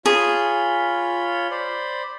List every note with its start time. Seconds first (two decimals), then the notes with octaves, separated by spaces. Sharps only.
0.06 F4 G#4 C#5 B5
1.51 C5 D5 B5